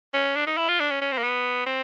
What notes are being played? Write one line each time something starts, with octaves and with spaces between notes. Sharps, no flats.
C#4
D4
D#4
E4
F4
D4
C#4
C#4
C4
A#3
B3
C4